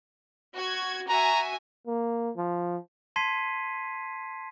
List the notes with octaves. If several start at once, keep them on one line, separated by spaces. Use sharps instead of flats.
F#4 G#6
F#4 E5 G#5 A#5
A#3
F3
A5 C6 G#6 B6 C7 D#7